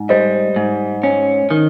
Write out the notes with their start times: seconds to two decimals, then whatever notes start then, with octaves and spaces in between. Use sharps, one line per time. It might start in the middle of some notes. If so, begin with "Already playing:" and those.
Already playing: G#2
0.09 G3 C5 D#5
0.56 G#2
1.03 C#4
1.51 D#3